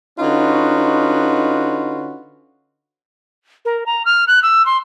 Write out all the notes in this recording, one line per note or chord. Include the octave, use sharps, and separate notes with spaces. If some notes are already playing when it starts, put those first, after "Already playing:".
D3 C#4 D#4 F4 F#4 B4
A#4
A#5
F6
F#6
E6
C6